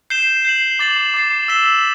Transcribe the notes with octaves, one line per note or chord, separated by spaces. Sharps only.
G6 C7 E7 G7
G6 C7 F#7
D6 A6 C7 F#7
D6 A6 C7
E6 B6 E7 G7